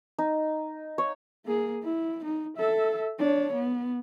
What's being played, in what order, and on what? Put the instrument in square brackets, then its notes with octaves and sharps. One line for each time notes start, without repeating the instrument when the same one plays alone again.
[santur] D#4
C#5
[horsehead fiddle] A#3 G#4
E4
D#4
A4 E5
D4 C#5
B3